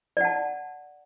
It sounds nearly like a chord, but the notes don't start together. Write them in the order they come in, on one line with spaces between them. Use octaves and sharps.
D5 F#5 A5